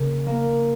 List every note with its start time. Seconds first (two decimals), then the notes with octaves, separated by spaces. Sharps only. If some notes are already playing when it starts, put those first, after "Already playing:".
Already playing: C#3 A#3
0.26 A#3